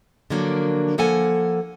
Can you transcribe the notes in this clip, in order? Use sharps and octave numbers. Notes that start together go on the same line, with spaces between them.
D3 F3 F#3 A#3 D4 A#4
F3 A#3 A4 F#5 G#5